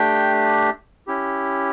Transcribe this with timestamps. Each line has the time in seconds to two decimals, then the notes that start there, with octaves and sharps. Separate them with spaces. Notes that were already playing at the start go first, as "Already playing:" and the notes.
Already playing: A3 D4 G4 G5
1.07 C#4 E4 G4